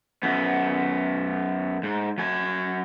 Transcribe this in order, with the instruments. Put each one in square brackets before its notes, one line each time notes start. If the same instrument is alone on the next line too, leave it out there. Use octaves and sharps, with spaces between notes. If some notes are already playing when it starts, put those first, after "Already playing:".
[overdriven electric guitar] F#2 B3
G#2
F#3 G#5